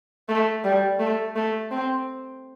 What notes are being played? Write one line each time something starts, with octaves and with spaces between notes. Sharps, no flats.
A3
G3
A3
A3
C4